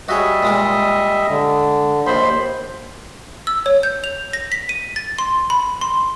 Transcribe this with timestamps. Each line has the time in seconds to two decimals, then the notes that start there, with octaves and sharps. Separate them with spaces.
0.09 G3 F#4 G#4 C#5 D#5 E5
0.43 A#2 G#3 A#4
1.29 D3
2.07 A#1 D#2 C5 B5 C6
3.47 E6
3.66 C#5
3.83 G6
4.04 F7
4.33 A#6
4.52 B6
4.69 D#7
4.96 A6
5.19 C6
5.50 B5
5.81 C6